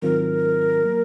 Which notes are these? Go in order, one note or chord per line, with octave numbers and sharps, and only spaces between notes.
G#2 D#3 F#3 C4 F4 A#4
F#3 A#3